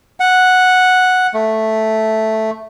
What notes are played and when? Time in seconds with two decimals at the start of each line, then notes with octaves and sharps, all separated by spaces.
0.20 F#5
1.34 A3